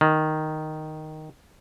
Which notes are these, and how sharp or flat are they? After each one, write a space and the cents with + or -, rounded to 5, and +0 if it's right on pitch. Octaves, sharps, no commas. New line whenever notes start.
D#3 +0